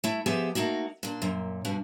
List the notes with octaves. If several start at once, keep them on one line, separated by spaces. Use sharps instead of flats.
A3 E4
F3 B3 G4 G#4 C5 E5
A3 A#3 D#4 F#4
A#2 D4
F#2 A#2
G2 B2 G3